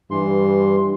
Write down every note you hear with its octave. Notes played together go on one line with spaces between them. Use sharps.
G2 E3 C6